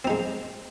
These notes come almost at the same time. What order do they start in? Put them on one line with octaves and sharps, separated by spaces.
C4 D#4 G#3